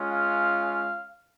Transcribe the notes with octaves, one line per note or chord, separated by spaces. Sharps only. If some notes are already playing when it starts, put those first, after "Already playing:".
Already playing: G#3 C#4 F4
F5